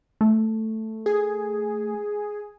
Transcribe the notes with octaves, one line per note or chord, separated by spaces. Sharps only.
A3
G#4